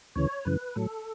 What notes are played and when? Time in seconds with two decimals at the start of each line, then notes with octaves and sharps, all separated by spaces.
0.16 D2 C#3 E3 C#5
0.45 F#2 C#3 E3 B4
0.76 A2 F#3 A4